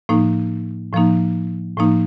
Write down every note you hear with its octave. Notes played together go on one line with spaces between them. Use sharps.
A2 F3 A#3 D#4
A2 F3 A#3 D#4
A2 F3 A#3 D#4